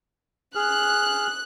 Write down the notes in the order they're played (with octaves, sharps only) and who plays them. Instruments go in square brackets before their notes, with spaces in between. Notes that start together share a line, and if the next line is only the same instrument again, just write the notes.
[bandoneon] G#4 F6 [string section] F#6